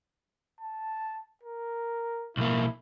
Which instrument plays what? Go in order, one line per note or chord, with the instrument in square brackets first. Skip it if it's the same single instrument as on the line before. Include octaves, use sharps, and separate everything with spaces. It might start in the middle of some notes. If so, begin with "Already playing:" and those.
[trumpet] A5
A#4
[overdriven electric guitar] B1 A#3 [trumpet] E4